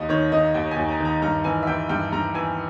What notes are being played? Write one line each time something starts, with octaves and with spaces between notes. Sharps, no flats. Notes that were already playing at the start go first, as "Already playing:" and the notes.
Already playing: D#2 D#5
D#3 C#5
D#3 D#5
D#2 G5
G#5
D#2
A#5
D#3
A#5
G2 A#5
E3 G#5
E5
E3 G5
G2 G5
G2 A#5
E3 G#5